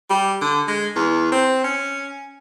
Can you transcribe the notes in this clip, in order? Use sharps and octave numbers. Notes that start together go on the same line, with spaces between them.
G3
D3
G#3
E2
C4
C#4